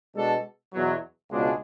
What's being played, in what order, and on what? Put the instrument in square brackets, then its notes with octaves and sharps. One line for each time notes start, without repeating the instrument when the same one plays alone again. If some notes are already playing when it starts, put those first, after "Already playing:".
[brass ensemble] B2 G#3 D4 A4
E2 B2 F#3
C#2 B2 G#3 D4